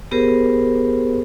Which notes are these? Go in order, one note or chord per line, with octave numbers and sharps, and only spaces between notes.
B3 G4 G#4 A#4 C5